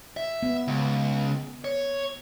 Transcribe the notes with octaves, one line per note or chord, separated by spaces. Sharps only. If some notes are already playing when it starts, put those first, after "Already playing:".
E5
B3
C#2
C#5